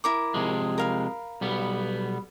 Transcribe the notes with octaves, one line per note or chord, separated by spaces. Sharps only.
E4 A#4 D6
C3 F3 G#3
A#4 F5 B5
B1 G3 B3